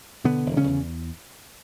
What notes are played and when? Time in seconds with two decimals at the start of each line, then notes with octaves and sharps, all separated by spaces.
0.24 B2 D3 B3
0.46 E1
0.57 C#3 C#4
0.67 E2